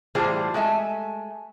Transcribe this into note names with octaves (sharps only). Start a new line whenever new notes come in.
A2 E3 G3 F4 G#4 C5
G#3 A3 E5 G#5